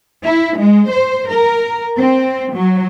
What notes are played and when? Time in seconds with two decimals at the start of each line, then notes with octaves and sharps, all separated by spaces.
0.25 E4
0.58 G#3
0.89 C5
1.28 A#4
1.97 C4
2.54 F#3